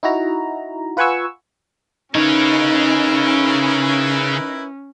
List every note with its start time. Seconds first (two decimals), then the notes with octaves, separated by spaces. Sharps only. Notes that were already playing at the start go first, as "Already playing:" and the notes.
0.03 D#4 E4 F#4 A#5
0.97 F4 B4 F#5 G#5 C#6 E6
2.15 C#3 C#4 D#4 E4 A#4 B4 C#5